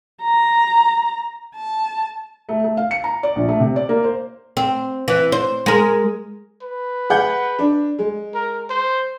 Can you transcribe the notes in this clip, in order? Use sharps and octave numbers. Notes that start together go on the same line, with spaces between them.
A#5
A5
A3
A3
F5
C#7
A#5
D5
A#1
A3
C3
D5
A#3
C5
C4
E3
C5
G#3 A#4
B4
G#4 F#5 G6
D4
G#3
A#4
C5